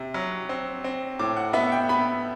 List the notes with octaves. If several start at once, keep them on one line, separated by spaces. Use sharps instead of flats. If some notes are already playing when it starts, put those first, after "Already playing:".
Already playing: C3
F#3
C4
C4
A2 D6
F#5
B3 E5
G5
B3 B5